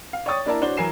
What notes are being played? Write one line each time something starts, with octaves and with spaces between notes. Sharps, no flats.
F5
C#5 D5 G5 C#6 D#6 A6
A#3 D4 E4 A#4 D5 A5
D4 F#4 C5 C#5 G7
E3 F#3 A#4 G#5 C7 E7